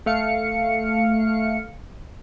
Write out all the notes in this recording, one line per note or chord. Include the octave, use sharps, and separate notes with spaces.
A3 F5 C#7